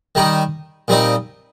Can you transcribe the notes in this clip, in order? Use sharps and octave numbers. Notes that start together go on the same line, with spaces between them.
D#3 G3 D#4
A#2 G3 C4 D#4